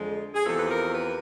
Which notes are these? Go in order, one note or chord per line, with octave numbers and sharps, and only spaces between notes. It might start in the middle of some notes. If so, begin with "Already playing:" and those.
Already playing: F2 D3 F3 G#3
G#4
E2 C3 F3 A4
B4
A#4
B4